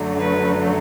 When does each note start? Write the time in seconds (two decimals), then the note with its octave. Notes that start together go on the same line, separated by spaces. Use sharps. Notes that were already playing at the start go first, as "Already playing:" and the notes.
Already playing: F#2 D3 F#3 A3
0.19 B4